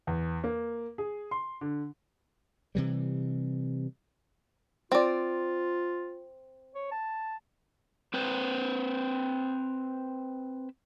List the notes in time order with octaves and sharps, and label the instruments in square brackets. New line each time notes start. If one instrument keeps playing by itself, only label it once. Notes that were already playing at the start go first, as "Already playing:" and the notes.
[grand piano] E2
A#3
G#4
C6
D3
[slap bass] C3 E3 G3
[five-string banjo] C4 D5 [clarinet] F4
[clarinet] C#5
A5
[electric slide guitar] C4 B4 C5